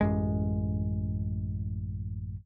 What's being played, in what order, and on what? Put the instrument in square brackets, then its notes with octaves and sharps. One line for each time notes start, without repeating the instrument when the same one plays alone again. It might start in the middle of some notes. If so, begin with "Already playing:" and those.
[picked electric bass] A1 F#2 G#3